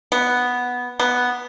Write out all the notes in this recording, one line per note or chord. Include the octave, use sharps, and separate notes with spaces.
B3
B3